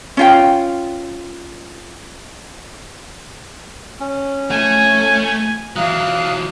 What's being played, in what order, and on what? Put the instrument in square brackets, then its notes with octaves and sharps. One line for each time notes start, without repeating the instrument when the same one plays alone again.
[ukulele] C#4 F4 G5
[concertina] C#4
[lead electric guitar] A3 [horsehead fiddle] G#5
[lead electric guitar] E3 F#3 [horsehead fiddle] F5 [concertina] D#6 F#6